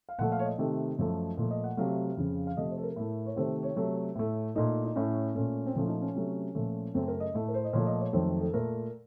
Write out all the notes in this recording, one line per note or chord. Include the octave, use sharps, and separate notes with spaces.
F5
A#2 F3 A3 F#5
F5
C#5
D#5
C3 D#3 A3
F#2 F3 A3
A#2 F3 A3
D#5
F#5
C3 F#3 A3 F5
F2 C#3 F3
F5
C3 F3 A3 D#5
C5
A4
A#4
A2 A3
C#5
C3 D#3 A3 C5
C#5
C3 F#3 A3
A2 A3
A#2 A3 D#4
D#4
A2 A3 C#4
A#2 A3 C#4
C4
A#2 F3 A3 C#4
F4
D#4
C#4
C3 F#3 A3
A#2 F3 A3
F#2 C#3 A3 C4
A#4
D#5
A2 A3
A#4
C5
D#5
A#2 F3 A3 C#5
D#5
C#5
F2 D#3 F#3 A3 C5
A4
A#2 A3 A#4